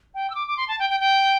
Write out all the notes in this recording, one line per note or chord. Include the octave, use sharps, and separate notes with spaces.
G5
E6
D6
D6
C6
A5
G5
G5
G5